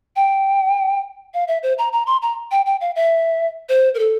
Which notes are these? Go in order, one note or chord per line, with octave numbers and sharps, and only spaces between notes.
G5
F5
E5
C5
A#5
A#5
C6
A#5
G5
G5
F5
E5
C5
A#4
A4